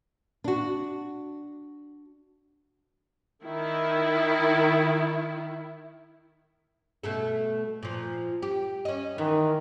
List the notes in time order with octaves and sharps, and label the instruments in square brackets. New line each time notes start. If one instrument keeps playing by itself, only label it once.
[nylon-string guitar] D4 F#4
[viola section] D#3 E4
[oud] B2 A3 A4
A#2 F3
G4
C#4 D#5
[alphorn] D#3 [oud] E3